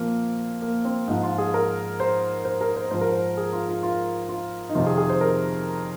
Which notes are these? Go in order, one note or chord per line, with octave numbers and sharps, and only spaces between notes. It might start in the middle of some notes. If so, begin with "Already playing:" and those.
Already playing: A#2 F3 A#3 C4
A#3
C4
G#2 F3 D#4
F4
G#4
A#4
C5
C5
A#4
C5
G#2 F3 C5
A#4
C5
G#4
F4
F4
F4
F4
D#4
F2 C3 D#3 F4
G#4
G#4
C5
A#4